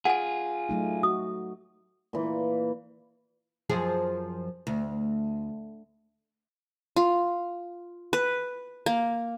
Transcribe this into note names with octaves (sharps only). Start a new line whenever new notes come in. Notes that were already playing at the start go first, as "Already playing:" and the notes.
F4 G#4 F#5 G#5
F#3 A3 D#4
F#4 D#6
A#2 E3
F#2 F3 G#4
D2
F4
B4
A#3